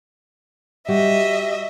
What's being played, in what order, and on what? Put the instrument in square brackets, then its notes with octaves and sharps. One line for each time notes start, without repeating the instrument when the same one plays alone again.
[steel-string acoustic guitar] G3 F#4 [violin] D#5 E5